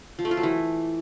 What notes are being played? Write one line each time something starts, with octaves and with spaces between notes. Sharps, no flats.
F3
A3
F4
F#3
E3